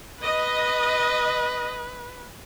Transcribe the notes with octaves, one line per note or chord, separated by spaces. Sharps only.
B4 D#5